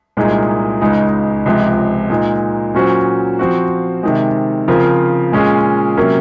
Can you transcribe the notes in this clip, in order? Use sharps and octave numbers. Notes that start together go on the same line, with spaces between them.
C2 A#2 G#3 D#4 G#4
C#2 C#3 G#3 D#4
C#2 C3 F3 G#3
A#2 G#3 D#4
A#2 F#3 C#4 F#4 C5
F3 C4 F#4
C3 D#3 G#3
C#3 F3 C4 F4 A#4
A#2 G#3 C#4 F4 G#4
C3 F#3 A#3 C#4